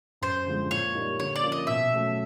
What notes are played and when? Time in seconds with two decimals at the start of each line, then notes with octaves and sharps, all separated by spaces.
0.21 F#2 C5
0.46 D3 F3 G#3
0.71 A#2 C#5
0.95 G3 A#3 D#4
1.19 D3 C#5
1.36 D5
1.43 F3 A#3 C#4
1.52 D#5
1.67 B2 E5
1.92 F#3 A3 C#4